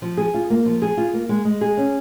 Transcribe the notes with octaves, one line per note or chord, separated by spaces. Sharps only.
F3
G#4
F4
A#3
F3
G#4
F4
A#3
G#3
G#3
G#4
C#4